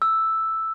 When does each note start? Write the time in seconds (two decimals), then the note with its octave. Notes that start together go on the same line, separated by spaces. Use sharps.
0.02 E6